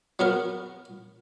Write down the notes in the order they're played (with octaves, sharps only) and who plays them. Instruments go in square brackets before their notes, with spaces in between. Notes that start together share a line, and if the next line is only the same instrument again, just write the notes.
[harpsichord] F#3 B3 A#4